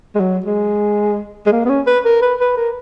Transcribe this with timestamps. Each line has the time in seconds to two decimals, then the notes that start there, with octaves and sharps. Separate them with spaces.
0.15 G#3
0.20 F#3
0.46 G#3
1.46 G#3
1.52 A#3
1.65 B3
1.70 C#4
1.87 B4
2.05 A#4
2.22 B4
2.40 B4
2.57 A#4